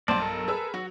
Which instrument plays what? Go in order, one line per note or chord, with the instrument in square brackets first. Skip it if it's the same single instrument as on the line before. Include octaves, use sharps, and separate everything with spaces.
[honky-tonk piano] B1 G2 [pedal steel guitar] C5 D5 [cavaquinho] A5
[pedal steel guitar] A4 A#4
[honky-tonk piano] G#4 B4 E6
[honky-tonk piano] F#3 [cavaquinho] F#4